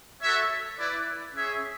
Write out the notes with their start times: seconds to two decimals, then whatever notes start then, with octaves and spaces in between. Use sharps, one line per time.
0.21 F#4 A4 C#5 E5
0.78 E4 B4 D5
1.34 C#4 G#4 C#5 E5